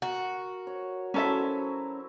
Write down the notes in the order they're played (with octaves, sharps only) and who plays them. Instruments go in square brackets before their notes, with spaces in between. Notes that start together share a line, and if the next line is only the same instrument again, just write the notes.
[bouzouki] F#4 [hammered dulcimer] A#4
[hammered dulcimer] C#5
[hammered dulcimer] F#3 E4 C5 [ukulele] C#4 A4 E5